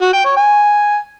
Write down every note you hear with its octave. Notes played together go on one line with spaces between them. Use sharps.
F#4
G5
C#5
G#5